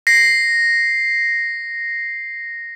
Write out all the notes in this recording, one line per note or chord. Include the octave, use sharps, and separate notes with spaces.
A#6 C7